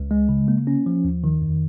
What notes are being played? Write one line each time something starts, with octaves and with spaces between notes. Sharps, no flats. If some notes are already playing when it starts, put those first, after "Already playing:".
Already playing: C#2
G#3
C#3
A#3
C#4
F3
D#2
D#3
F2